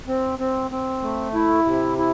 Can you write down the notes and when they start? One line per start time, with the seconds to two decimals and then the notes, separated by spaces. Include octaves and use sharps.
0.08 C4
0.39 C4
0.71 C4
1.02 A3
1.34 E4
1.65 C3
1.98 E4